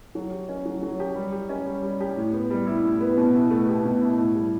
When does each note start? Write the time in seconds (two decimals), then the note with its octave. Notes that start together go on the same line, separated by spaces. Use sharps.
0.15 F#3
0.32 G4
0.49 C#4
0.66 F#3
0.83 F#3
1.00 G4
1.15 G3
1.32 G4
1.49 C#4
1.66 G3
1.83 G3
2.00 G4
2.16 A2
2.33 B3
2.50 G3
2.67 E4
2.83 A2
3.00 B3
3.17 B2
3.34 E4
3.51 A3
3.68 G4
3.85 B2
4.01 E4
4.19 A2
4.35 G3